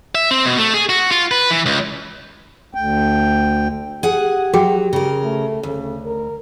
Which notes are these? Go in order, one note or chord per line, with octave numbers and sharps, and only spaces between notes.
E5
C4
B2
A3
G#4
F#4
F4
B4
E3
C#2
D2 G5
G4 G#4 F#5
F#3 F#4 G#4 G5
C#3 A#4
A3
D2 C#3
A#4